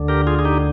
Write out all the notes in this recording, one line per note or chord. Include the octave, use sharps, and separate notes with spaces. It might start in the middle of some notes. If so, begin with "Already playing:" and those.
Already playing: D2 D3
G4 A#4
F4 G#4
G#4
D#4 G4